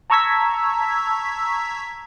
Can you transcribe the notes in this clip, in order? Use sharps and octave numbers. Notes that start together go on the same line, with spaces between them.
A5 A#5 C#6 E6 G#6 B6